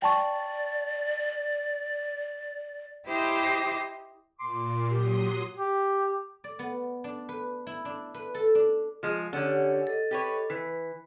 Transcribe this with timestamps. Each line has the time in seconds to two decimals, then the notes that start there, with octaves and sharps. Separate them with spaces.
0.02 D5 G5 A5 C#6
3.06 E4 G4 C5 D#5 G5 D6
4.40 A#2 C6 D6
4.91 F#3 G4 C6 D#6
5.57 G4
6.44 D5
6.59 B3
7.04 D4
7.29 B4
7.67 E4
7.85 D4
8.14 B4
8.35 A4
8.55 D4
9.03 F3 G#3
9.33 D3 C#4 G4 C#5 F#5
9.87 A4 D#5
10.11 G4 B4 C#5
10.50 E3 B4